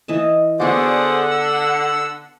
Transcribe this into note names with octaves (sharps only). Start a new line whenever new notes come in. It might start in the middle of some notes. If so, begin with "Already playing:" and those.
E3 D#5 A5
D3 B3 F#4 G#4 C5 D5 F#5
E6